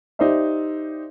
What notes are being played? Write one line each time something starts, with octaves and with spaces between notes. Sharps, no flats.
D#4 G4 C5 D5 E5